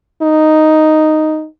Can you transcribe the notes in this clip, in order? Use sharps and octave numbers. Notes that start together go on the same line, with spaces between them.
D#4